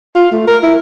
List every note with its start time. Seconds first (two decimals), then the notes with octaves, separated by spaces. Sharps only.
0.15 F4
0.32 A3
0.48 A#4
0.63 E4